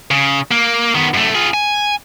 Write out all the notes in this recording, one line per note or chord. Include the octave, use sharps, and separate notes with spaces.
C#3
A#3
D#3 B3
F#2 A3
F4 G#4
G#5